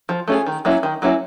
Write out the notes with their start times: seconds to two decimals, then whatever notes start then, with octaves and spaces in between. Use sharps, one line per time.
0.09 F3
0.28 A3 C#4 F4 G#4
0.47 D#3
0.65 F#3 A#3 C#4 E4
0.83 D#3
1.02 F#3 A#3 C#4 E4